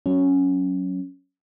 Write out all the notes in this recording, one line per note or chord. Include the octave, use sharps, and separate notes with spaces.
F#3 C#4